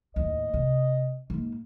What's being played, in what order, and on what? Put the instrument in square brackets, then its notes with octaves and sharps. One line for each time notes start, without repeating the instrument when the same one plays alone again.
[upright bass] D#2 A2 [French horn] D#5
[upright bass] C3
G#2 A#3